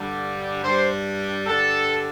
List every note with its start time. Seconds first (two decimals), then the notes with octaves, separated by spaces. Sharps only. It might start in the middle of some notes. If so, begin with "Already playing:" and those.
Already playing: G2 D3 G3
0.63 G2 G3 C5
1.46 G2 D3 G3 A4